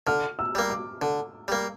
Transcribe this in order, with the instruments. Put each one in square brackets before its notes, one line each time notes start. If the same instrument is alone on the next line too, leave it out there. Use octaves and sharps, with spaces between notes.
[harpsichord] D3 [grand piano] F6
[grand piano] E6
[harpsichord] G3 A#3
[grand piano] D6
[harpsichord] D3
G3 A#3